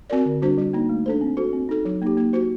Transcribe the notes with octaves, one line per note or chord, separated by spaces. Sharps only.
C4 F#4 A#4 D5
D3
G3 D4 F#4 C5
G3
A#3 D#4
A3
D4 A4 C5
C4
F#4 A4 C5
C4
D#4 A4
F#3
A#3 D#4 G4
A#3
F#4 C5